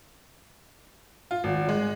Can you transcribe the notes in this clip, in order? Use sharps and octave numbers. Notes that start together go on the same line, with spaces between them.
F4
G#1
G#3